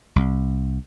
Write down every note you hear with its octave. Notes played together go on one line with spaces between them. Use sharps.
C2